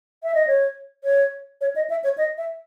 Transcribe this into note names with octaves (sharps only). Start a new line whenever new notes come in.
E5
D#5
C#5
C#5
C#5
D#5
E5
C#5
D#5
E5